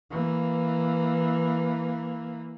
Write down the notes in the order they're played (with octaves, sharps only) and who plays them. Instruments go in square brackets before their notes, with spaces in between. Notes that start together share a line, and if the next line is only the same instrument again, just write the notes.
[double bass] E3 A#3